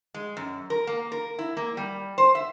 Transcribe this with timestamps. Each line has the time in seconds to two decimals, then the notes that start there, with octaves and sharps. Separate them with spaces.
0.14 G#3
0.37 F#2
0.70 A#4
0.87 A#3
1.12 A#4
1.39 E4
1.57 A#3
1.77 G3
2.18 C5
2.35 E5